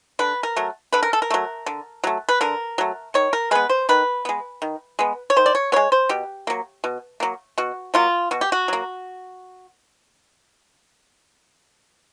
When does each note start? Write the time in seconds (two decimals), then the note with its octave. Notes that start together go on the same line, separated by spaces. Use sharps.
0.19 D3 B4
0.43 A#4
0.56 F#3 A3
0.92 D3 B4
1.03 A#4
1.13 A4
1.22 A#4
1.30 F#3 A3
1.66 D3
2.04 F#3 A3
2.29 B4
2.41 D3 A#4
2.78 F#3 A3
3.14 D#3 C#5
3.33 A#4
3.51 G#3 B3 B4
3.69 C5
3.89 D#3 B4
4.25 G#3 B3
4.62 D#3
4.99 G#3 B3
5.30 C#5
5.36 D#3 C5
5.46 D5
5.55 C#5
5.72 G#3 B3 C#5
5.92 C5
6.09 B2 G4
6.47 F#3 A#3
6.84 B2
7.20 F#3 A#3
7.58 B2 F#4
7.94 F#3 A#3 F4
8.31 B2 F#4
8.41 G4
8.52 F#4
8.68 F#3 A#3